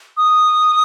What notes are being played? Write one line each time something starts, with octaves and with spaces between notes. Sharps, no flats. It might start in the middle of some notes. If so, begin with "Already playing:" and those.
D#6